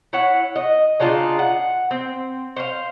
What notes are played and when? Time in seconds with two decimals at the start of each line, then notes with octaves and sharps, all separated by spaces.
0.13 E4 C#5 F#5
0.56 D#5
1.00 C#3 D4 D#4 F4
1.39 F#5
1.91 C4
2.56 C5 C#5 F5